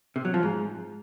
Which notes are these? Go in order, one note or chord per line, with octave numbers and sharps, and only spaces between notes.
C3
F#3
F3
G#2